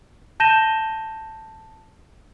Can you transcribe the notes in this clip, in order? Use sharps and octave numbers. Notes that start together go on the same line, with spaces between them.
A5 G6 A#6 D#7 E7 G7